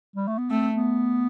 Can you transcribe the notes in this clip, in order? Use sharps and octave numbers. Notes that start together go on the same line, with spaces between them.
G3
A3
B3
A3 C4
B3